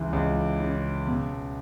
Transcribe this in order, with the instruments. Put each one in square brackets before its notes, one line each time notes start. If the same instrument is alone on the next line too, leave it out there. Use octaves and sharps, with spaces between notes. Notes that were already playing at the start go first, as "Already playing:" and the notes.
Already playing: [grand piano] C#2 E3
C#2
C#3
B2